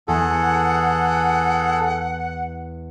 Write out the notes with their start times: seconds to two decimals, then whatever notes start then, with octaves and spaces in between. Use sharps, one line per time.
0.08 E2 G#4 A4 F#5